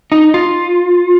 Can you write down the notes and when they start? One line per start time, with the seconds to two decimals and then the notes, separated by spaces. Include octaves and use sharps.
0.12 D#4
0.34 F4